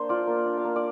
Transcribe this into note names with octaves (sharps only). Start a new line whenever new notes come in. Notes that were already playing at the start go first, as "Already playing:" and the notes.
Already playing: A#3 D4 C5
F4 D5
A#3
D4
F5
A#3
D5